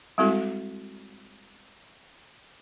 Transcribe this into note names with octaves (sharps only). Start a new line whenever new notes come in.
G3 G#3 C4 E4 F#4 A4